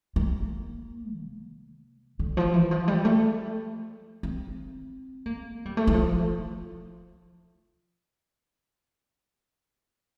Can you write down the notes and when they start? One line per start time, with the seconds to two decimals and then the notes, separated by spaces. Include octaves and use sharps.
0.16 A#3
1.18 C3
2.19 D3
2.37 F3
2.54 E3
2.71 F3
2.88 G3
3.05 A3
4.23 C4
5.26 A#3
5.65 G3
5.77 A3
5.87 E3
5.94 F3